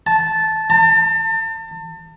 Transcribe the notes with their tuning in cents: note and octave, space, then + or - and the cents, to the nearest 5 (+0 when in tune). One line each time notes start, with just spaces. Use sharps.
A5 -10
A5 +35